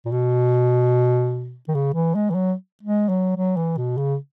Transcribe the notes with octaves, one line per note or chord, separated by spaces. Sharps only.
A#2
B2
D#3
C#3
E3
G#3
E3
F#3
G#3
F#3
F#3
E3
B2
C#3